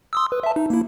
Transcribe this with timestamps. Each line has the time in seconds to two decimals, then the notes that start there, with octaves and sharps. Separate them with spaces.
0.13 C6 D#6 E6
0.32 B4
0.43 E5 A5
0.56 D#4
0.70 A#3 E4